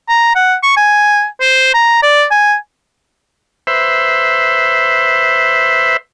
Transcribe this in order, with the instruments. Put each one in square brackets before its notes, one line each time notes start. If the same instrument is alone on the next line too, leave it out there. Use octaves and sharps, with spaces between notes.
[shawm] A#5
F#5
C#6
G#5
C5
A#5
D5
G#5
[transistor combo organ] B4 C5 E5